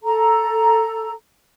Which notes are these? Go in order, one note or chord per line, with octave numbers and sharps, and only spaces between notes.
A4 A#5